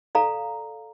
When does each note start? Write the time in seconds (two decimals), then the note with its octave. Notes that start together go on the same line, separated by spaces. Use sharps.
0.15 A4 D5 F5 A#5